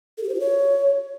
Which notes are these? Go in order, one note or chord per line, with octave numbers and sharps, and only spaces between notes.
A4
G4
C5
F4
C#5